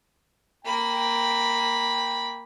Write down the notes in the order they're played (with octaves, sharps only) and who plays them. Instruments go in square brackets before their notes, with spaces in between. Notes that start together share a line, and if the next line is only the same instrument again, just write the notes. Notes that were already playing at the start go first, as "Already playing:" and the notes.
[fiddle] A#3 B5 [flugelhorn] G5